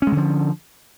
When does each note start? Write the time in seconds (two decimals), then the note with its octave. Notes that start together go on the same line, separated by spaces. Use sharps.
0.02 C#4
0.07 G#3
0.12 D3
0.17 F3